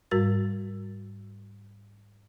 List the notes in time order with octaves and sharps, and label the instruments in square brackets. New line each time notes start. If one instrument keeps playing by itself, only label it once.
[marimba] G#2 G3 F#4 A#4 A6